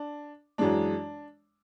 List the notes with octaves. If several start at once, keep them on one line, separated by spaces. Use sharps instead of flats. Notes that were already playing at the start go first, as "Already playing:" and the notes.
Already playing: D4
F#2 E3 G#3 D4